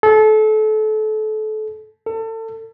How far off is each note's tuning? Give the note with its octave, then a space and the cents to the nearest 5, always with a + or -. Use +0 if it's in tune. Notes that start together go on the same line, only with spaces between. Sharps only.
A4 -30
A4 +30